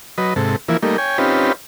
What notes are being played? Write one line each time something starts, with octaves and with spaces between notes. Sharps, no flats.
F#3 B4 D#5
G#2 C3 A4
E3 F3 A#3 E4
G3 A3 A#3 D#4
C#5 G5 G#5
C4 C#4 D#4 F4 G4 B4